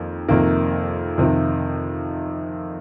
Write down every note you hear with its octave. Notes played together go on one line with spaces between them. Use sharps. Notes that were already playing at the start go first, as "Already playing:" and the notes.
Already playing: F2 D#3 A#3
F2 C3 D#3 A#3
F2 C3 D#3